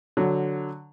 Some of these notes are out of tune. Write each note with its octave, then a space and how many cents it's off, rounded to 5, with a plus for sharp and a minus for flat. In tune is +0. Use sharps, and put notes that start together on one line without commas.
D3 +0 F#3 +0